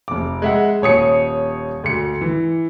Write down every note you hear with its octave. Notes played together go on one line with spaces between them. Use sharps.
F1 D6
G#3 E5 F#5
D#1 C#5 D#6 C#7
D2 C#7
E3